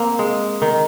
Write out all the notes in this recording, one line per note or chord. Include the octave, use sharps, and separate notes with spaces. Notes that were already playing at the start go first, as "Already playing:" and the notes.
Already playing: A#3 C4
G#3
D#3